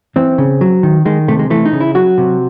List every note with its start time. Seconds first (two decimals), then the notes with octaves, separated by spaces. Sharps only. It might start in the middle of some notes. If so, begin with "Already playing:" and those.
0.16 E3 C4
0.38 C#3
0.61 F#3
0.83 D#3
1.05 D#3 G#3
1.28 C3 A3
1.39 G#3
1.50 E3 A3
1.65 D#4
1.73 C#3
1.80 E4
1.95 F#3 F#4
2.18 C3